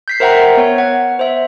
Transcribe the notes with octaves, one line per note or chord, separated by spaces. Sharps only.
G6 B6 C7
A#4 C5 E5 F#5 G5 A#5
B3 C#5
F#5
C5 E5